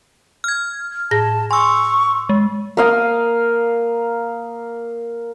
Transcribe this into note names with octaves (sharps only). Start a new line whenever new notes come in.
F6 G#6
A2 G#4 A5 A#6
G#5 C6 C#6 E6
G#3
A#3 F5 D#6